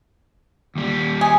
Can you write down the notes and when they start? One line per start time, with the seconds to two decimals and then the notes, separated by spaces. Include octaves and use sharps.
0.76 D#2 G3
1.21 G#4